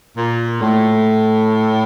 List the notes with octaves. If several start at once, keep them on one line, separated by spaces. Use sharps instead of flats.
A#2
A2